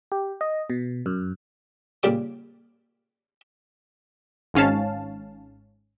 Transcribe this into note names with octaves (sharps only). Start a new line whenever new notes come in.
G4
D#5
B2
F#2
A#2 C#3 G3 D6
G#1 G#2 C#4 F5 A5